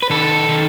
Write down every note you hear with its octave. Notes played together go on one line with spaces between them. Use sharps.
B4
D#3 A4
D#3